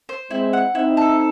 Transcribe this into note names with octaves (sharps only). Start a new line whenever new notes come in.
C5
G#3 C4 E4
F#5
C4 D#4 E4
A4